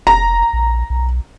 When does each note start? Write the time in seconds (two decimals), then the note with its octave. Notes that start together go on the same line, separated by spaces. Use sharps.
0.07 F1 A#5
0.53 A#1
0.90 B1